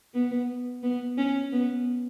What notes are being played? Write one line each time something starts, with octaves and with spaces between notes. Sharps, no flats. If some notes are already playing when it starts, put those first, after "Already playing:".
B3
B3
C#4
B3